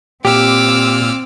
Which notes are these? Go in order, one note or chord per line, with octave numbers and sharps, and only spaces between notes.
A#2 C4 G4 D6 E6 F6